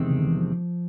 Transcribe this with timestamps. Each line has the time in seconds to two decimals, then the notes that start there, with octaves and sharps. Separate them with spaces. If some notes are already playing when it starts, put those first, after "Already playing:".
Already playing: E2 C3 D#3 G#3 C4
0.10 C#3
0.19 D3
0.27 E3
0.36 F3